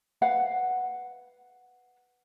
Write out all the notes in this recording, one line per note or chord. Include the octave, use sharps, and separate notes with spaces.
B4 F5 F#5